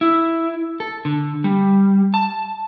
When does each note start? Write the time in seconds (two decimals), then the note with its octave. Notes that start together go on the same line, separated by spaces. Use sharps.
0.01 E4
0.80 A4
1.05 D3
1.44 G3
2.14 A5